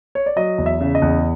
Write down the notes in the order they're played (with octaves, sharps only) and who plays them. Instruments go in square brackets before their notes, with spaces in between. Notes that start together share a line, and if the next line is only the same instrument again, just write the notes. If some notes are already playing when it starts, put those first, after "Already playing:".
[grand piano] C#5
D5
F#3 D#5
E2
E5
C#3
D#5
E2